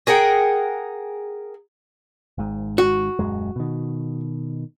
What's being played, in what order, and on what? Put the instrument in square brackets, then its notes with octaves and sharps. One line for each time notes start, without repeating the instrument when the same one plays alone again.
[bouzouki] G#4 A#4 F#5 G5
[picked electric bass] G#1 G#2
[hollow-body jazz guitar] F#4
[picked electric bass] D#1 F#2 G#3
B2 D#3